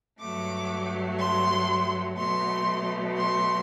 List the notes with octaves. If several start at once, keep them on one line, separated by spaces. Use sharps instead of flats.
G2 F#3 A3 D6
C6
B2 F#3 A3 C6
C6